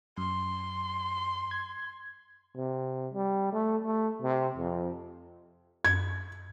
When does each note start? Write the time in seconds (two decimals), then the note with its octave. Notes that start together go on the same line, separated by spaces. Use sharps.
0.18 F#2 C6
1.51 G#6
2.57 C3
3.14 G3
3.52 A3
3.84 A3
4.22 C3
4.57 F2
5.85 F#2 G#6